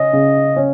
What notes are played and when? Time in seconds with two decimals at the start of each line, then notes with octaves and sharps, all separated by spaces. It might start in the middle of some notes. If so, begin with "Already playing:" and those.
Already playing: C#3 C#4 D#5
0.13 C#3
0.56 C#4